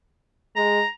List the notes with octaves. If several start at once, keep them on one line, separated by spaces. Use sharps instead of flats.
G#3 A#5